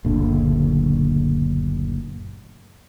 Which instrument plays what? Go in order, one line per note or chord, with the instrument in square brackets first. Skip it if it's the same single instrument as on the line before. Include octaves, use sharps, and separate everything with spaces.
[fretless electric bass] F#1 D2 A#2 D3